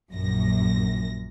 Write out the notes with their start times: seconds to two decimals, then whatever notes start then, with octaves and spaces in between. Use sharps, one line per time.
0.11 A#1 F#2 A#6